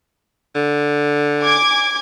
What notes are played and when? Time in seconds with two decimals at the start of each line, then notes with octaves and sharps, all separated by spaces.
0.55 D3
1.41 G#5 D6 G#6